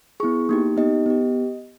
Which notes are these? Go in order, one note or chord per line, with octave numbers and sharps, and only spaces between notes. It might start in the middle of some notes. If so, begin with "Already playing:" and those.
B3 E4 G#4 C#6
A#3 D#4 G4
B3 D#4 G4 D#5
B3 G4